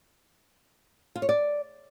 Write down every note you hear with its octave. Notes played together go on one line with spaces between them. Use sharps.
F4
C#5
D5